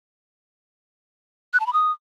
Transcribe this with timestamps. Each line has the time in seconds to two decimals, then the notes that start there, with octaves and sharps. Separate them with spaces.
1.53 F#6
1.60 A5
1.67 B5
1.73 D#6